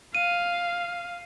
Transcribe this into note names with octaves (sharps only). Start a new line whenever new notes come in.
F5 D#7